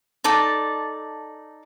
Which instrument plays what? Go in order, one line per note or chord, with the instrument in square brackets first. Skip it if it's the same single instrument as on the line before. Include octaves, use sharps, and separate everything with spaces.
[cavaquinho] D#4 A4 D5 A5